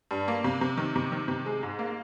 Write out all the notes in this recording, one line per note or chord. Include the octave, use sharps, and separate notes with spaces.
G2
A#3
C3
C3
D#3
C3
D#3
C3
G#3
G#2
A#3